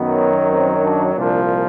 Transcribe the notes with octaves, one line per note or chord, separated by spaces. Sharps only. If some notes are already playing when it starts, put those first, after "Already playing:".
Already playing: F#2 D#3 F#3 B3
C4
D4
C2 A#2 F3 D4